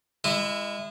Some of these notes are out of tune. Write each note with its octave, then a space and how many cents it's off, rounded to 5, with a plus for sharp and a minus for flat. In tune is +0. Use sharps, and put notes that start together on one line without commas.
G#3 -25 E4 +5